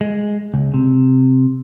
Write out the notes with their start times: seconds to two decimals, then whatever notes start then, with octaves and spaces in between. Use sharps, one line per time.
0.01 G#3
0.54 C#2
0.74 C3